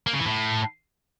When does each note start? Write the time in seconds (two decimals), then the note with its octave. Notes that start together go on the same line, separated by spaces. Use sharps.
0.07 A#3
0.13 C#3
0.20 E3
0.26 A2